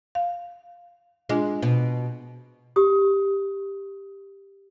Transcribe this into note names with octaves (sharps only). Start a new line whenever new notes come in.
F5
G#3 D4 F4 G#4
B2
G4 D#6